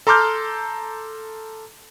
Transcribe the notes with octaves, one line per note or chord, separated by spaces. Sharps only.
A4 A#5 C6 D6 F6 G6